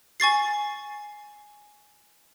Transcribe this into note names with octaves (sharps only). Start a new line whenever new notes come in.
G#5 C#6 A6 C7